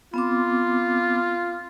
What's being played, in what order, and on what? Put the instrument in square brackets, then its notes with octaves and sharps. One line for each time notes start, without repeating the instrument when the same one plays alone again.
[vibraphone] B3 C4 D6 [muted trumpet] F4